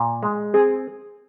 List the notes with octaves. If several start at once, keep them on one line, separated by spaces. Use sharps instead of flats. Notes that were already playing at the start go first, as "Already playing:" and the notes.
Already playing: A#2
G#3
C4 G#4